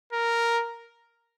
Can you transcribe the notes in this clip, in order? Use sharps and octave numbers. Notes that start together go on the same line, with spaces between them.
A#4